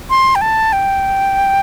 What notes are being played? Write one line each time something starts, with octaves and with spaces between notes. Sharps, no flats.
C6
G5
A5
G5